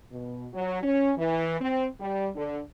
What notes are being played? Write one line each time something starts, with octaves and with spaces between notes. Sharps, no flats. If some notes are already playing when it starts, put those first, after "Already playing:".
B2
F#3
C#4
E3
C4
G3
D3